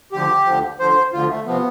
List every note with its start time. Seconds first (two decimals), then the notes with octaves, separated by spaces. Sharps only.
0.12 D2 D3 F3 G4
0.45 D2 D3 F3
0.79 D2 D3 F3 C5
1.13 D2 D3 F3 F4
1.29 A3
1.46 C3 F3 B3